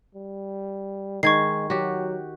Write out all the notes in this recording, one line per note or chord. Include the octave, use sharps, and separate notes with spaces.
G3
D#3 G#3 C#6 G#6 C7
F#3 F#4 G4